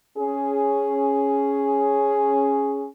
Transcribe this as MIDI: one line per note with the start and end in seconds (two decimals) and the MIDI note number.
0.18 2.86 61
0.18 2.86 68